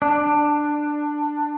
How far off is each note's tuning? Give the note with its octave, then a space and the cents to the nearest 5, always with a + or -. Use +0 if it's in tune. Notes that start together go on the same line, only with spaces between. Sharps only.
D4 +10